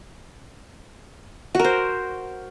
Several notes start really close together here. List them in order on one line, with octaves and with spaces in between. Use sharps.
F#4 A#4 C5